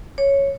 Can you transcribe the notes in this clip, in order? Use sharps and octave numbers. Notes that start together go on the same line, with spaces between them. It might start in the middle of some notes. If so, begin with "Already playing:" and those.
C#5